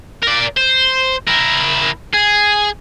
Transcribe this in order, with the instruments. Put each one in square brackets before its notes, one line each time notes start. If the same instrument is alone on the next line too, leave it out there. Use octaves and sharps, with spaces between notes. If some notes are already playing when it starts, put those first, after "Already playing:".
[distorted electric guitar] A#4 D5
C5
E4 A#4
G#4